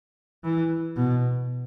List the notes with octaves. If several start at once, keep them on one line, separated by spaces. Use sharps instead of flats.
E3
B2